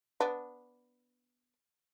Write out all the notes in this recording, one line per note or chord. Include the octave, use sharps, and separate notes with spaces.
B3 D4